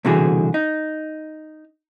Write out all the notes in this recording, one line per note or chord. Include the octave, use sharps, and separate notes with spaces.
C2 B2 D3 E3 F#4 G#4
D#4